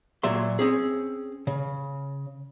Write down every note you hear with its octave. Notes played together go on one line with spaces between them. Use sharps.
A#2 F#3 E5 C6
C4 C#4 G#4
C#3